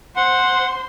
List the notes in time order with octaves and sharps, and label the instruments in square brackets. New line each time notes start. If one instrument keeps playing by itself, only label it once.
[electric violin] C5 C6 [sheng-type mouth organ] F#5